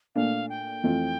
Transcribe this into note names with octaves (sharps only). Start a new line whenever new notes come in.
A#2 A3 D4 F5
G5
F2 E3 A3 C4 F4